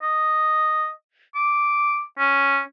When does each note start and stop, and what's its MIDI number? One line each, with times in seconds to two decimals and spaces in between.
0.02 0.90 75
1.35 2.02 86
2.19 2.60 61